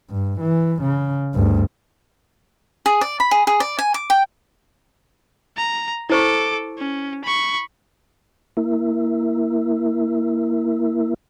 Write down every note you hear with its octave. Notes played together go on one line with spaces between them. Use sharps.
G2
E3
C#3
D2 G2
G#4
D5
B5
G#4
G#4
D5
G#5
D6
G5
A#5
E4 A4 C5 C#6 D6
C#4
B5 C#6
A#3 E4